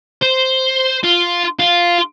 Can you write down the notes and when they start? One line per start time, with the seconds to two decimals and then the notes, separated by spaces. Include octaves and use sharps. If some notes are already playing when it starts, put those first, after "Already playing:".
0.22 C5
1.03 F4
1.59 F4